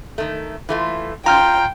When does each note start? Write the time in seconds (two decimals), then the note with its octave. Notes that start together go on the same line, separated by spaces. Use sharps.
0.18 D#3 A3
0.69 E3 A3 F4
1.26 C#4 F4 G5 A#5 F6 G6